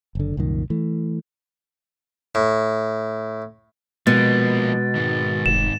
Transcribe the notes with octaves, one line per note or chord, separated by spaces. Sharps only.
F#1 D3
C2 F#2 A#2 D#3
E3 A3
A2
B2 F3 G#3 A#3 A6
G#2 D#3
F1 E7